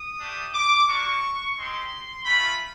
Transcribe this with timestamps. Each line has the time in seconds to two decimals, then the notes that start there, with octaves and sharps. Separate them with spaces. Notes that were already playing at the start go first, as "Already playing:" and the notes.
Already playing: D#6
0.19 A3 D4 G4
0.53 D6
0.87 A#3 D4 F#4 C#6
1.57 G#3 C4 D#4 G4 C6
2.25 A3 C#4 F4 B5